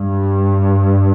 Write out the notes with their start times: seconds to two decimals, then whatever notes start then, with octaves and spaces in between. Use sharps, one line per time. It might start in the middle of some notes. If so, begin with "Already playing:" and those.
Already playing: G2